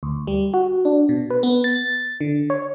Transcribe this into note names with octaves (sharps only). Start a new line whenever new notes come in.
D2
G3
F#4
D4
B2
B4
B3
A6
D3
C#5